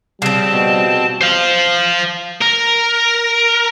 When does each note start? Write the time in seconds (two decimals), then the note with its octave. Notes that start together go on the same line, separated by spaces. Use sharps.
0.22 C#3 F3 G3 C4 A5
0.52 B2
1.21 C5 F5
2.41 A#4